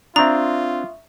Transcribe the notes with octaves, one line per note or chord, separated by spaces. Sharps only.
C4 D4 F4 E5 A#5 C#6 D#6